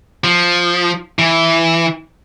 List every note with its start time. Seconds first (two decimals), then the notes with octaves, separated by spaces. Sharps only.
0.24 F3
1.19 E3